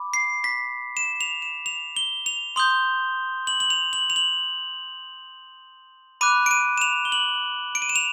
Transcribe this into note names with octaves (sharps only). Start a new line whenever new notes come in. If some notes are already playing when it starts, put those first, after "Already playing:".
Already playing: B5 D6
C7
B6
E7
F7
E7
F7
G7
F7
C6 D#6 G6 G7
F#7
F#7
F7
F#7
F7
F#7
B5 D6 F#6 D#7
D7
D#7
E7
F7
G7
F#7
D7
D#7
E7
F7